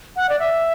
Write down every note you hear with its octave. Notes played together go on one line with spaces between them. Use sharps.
F#5
D5
E5